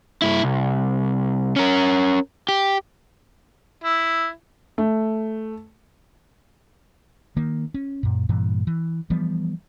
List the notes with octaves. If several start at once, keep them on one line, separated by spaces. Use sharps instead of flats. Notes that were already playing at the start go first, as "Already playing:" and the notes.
G2 E4
C2
C#4 A#4
G4
E4
A3
D#3 A#3
C#4
F#2 A#2
G2 A#2 E3
E3
E3 F3 G3 B3